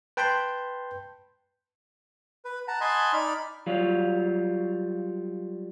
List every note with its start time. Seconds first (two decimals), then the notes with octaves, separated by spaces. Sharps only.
0.17 B4 G5 A5 B5 C6 G6
2.45 B4
2.68 F#5 A5 A#5
2.81 D#5 F#5 G#5 A5 B5 C6
3.13 D#4 D5 B5 F6
3.67 F#3 G3 F4